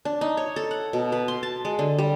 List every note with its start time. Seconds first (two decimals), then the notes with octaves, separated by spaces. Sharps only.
0.05 D4
0.21 D#4
0.37 C#5
0.56 A4
0.71 F#5
0.93 B2
1.12 B4
1.28 C6
1.43 A5
1.65 G#3
1.79 D3
1.98 G3